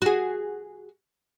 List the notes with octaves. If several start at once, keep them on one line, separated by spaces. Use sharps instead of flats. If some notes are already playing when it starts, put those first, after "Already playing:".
F#4 G#4